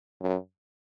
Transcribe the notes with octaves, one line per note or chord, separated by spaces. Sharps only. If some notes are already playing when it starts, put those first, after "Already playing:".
F#2